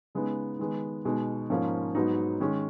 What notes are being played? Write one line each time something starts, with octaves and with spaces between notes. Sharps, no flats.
C#3 G#3 B3 D#4
D#3 G#3 B3
B2 G#3 D#4
G#2 F3 A#3 C#4
G#2 F#3 B3 D#4
D#3 G#3 C#4